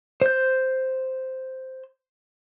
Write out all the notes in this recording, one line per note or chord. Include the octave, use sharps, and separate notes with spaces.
C5 G6